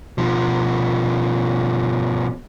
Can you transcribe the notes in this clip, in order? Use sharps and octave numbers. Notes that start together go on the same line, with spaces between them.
B2 F3